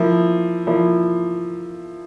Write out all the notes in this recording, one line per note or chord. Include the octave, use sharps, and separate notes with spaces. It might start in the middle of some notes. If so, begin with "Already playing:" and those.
Already playing: F3 A#3 E4
F3 A#3 E4